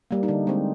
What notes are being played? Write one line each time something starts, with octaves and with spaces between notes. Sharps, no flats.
G3 A#3
D#4
D3 D4
G#3 C4